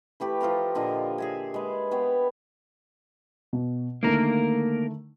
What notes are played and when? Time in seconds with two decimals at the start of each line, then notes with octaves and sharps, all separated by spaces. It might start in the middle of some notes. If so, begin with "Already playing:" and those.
0.20 E3 A3 G4 B4
0.41 F3 F4 A4 A#5
0.75 A#2 D3 F4 D#5
1.18 G#4 E5 G#5
1.54 G#3 B4
1.91 B3 C#5 G5
3.53 B2
4.03 D3 D#3 A3 A#3 A#4